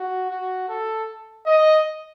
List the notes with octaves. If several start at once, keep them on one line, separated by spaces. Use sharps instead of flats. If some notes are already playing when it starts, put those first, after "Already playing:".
Already playing: F#4
F#4
A4
D#5